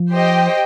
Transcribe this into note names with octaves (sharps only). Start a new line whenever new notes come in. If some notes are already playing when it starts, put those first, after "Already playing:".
Already playing: F3
G4 C5 D#5 G5